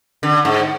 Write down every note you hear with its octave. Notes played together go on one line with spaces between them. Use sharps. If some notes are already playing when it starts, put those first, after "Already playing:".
D3
G#2